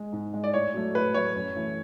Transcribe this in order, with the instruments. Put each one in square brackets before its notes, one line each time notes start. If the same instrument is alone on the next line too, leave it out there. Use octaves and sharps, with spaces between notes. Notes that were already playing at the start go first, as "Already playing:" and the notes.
Already playing: [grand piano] G#3
G#2
G#3
D5
A2 C#5
F#3 A3
A2 B4
F#3 A3 C#5
F#2
E3 A3